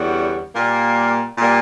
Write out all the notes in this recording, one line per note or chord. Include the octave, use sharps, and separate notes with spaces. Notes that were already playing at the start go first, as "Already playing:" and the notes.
Already playing: E2 D3 G3 C#4 F#4
A#2 G3 A#3
A#2 G3 A#3